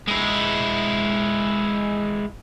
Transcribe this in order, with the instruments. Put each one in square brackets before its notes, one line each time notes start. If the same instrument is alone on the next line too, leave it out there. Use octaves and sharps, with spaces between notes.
[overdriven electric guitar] G#3 E4